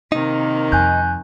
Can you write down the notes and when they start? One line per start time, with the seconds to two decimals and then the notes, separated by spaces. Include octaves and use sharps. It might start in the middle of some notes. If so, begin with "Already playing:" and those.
0.12 C3 D#3 A#3 D#4
0.72 F2 G#5 F#6 G6